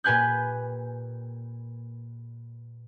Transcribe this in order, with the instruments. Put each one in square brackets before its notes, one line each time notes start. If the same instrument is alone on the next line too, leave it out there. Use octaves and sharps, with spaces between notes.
[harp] A#2 G4 B4 G#5 F#6 G6